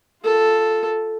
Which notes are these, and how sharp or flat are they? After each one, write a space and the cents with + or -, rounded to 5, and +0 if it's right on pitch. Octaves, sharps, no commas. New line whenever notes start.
F4 +0 A4 +0